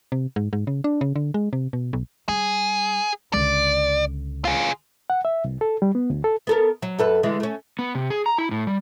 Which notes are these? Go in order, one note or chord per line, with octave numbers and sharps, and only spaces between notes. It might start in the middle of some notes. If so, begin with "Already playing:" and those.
C3
G#2
G#2
C#3
D4
C#3
D3
G#3
C3
B2
B1
G3 G#4
C#2 D3 D5
F4 G#4
F#5
E5
C2
A4
G3
B3
D2
A4
B3 A4 A#4
F#3
F#2 A4 B4
D3 E3 G#3
A3 C#4
B3
C3
G#4
A#5
E4
A2
G3